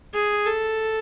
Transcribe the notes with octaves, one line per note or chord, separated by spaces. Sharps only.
G#4
A4